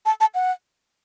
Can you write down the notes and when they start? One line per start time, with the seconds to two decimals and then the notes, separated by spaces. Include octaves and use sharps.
0.06 A5
0.20 A5
0.35 F#5